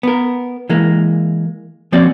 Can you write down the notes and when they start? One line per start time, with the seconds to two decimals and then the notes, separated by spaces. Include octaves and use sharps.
0.03 B3 A#4
0.69 E3 G#3 A#3
1.92 F3 A#3 C4 C#4 F#4 D5